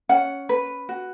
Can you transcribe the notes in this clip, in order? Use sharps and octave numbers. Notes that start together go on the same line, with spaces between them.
C#4 F#5
B4
F#4